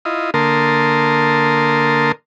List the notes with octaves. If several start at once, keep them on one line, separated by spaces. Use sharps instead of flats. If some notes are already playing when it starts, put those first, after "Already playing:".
E4 F4 D#5
D3 A#3 A#4 A5 C6 D#6